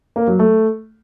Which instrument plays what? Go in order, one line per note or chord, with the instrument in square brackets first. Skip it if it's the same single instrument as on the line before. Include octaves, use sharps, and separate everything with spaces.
[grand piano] A#3
F#3
A3